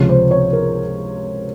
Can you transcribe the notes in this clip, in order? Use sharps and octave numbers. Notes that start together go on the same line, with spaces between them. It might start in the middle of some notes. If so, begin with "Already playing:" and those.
Already playing: C#2 C3 F3 C#5
C5
C#5
A#4